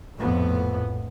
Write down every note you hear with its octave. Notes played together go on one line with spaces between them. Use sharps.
A#1 F2 A2 B3